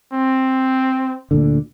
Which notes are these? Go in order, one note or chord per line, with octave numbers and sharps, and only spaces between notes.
C4
D2 A#2 D3